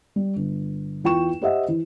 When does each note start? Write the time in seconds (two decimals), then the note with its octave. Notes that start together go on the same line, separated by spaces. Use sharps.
0.16 G3
0.36 G1
1.04 E2 F4 G5 C#6 E7
1.42 G4 C5 D#5 E5 F#5
1.68 E3